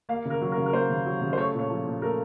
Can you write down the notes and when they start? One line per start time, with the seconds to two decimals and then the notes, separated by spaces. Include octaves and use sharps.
0.09 A#3 F5
0.25 C#3 A#4
0.41 F#3
0.52 A#4
0.57 C#3
0.66 A#4
0.73 A#3 C5
0.90 C#3
1.05 F#3
1.21 C#3
1.33 C5
1.37 A3 C#5
1.53 A#2
1.59 C#5
1.70 F3
1.86 A#2
2.02 A3 A#4